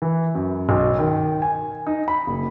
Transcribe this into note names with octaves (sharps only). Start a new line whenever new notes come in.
E3
F#2
B1
D#3
G#5
D#4
B5
F#1